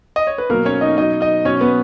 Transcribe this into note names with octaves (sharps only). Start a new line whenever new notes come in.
D#5
C#5
B4
B2 F#3 A#3 A#4
C#4 C#5
D#4 D#5
B2 F#3 D#4 D#5
D#4 D#5
B2 F#3 C#4 C#5
B3 B4